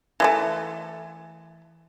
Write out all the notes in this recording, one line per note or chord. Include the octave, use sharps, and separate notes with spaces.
E3 G#3 A3